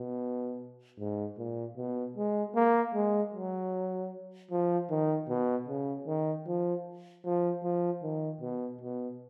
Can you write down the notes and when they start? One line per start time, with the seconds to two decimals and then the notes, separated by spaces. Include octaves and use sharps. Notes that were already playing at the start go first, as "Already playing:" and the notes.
Already playing: B2
0.99 G#2
1.38 A#2
1.77 B2
2.16 G#3
2.55 A#3
2.95 G#3
3.34 F#3
4.51 F3
4.90 D#3
5.29 B2
5.68 C#3
6.07 D#3
6.47 F3
7.24 F3
7.64 F3
8.03 D#3
8.41 B2
8.81 B2